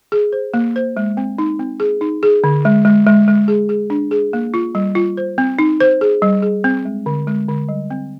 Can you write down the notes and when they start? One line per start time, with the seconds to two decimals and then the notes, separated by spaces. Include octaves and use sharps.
0.12 G#4
0.33 C5
0.54 A#3
0.76 C5
0.97 G#3
1.17 C4
1.38 D#4
1.59 C4
1.80 G#4
2.01 D#4
2.23 G#4
2.44 D3
2.65 G#3
2.85 G#3
3.07 G#3
3.28 G#3
3.48 G#4
3.69 G#4
3.90 D4
4.11 G#4
4.33 A#3
4.54 F4
4.75 G3
4.95 F4
5.17 C5
5.38 C4
5.59 D#4
5.80 C5
6.01 G#4
6.22 G3
6.42 G#4
6.64 C4
6.85 G#3
7.06 D3
7.27 G#3
7.49 D3
7.69 G3
7.91 C4